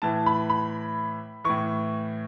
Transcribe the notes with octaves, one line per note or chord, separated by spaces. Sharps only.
A2 E3 A5
B5
B5
A2 E3 C#6